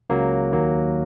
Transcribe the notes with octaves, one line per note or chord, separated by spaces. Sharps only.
C#2 C#3 F#3 A#3
D#2 D#3 F#3 A#3